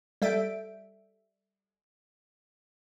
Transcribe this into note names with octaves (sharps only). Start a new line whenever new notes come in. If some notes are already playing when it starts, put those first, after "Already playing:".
G3 A4 E5 G6 D7